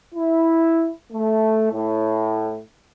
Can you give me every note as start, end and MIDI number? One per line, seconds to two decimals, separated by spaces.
0.14 0.89 64
1.12 1.70 57
1.72 2.58 45